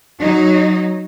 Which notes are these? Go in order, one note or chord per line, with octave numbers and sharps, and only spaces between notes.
F#3 D#4